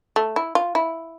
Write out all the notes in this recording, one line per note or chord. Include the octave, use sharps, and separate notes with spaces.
A3
E4
F4
E4